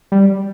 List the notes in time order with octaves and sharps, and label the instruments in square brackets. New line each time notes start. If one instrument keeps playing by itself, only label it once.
[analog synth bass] G3